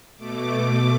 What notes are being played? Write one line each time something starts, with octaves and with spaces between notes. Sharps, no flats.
B2 A3 D6
D6